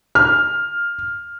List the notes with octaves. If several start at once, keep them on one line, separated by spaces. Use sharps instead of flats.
F6